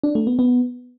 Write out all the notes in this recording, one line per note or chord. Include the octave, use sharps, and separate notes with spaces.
D4
A3
B3
B3